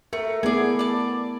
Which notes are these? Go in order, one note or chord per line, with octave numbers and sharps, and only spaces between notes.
A3 A#4
A3 B3 E4 G#4 D5
D5 A5